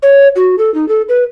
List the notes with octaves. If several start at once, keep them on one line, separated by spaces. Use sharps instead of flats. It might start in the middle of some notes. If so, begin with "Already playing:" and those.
C#5
F#4
A4
D#4
A4
B4